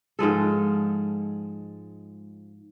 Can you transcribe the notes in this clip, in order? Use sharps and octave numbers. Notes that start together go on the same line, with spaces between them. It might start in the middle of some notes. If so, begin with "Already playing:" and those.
G#2 F3 G#3 A4